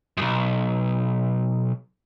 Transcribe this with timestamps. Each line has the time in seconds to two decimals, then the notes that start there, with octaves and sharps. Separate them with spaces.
0.17 B1 F#2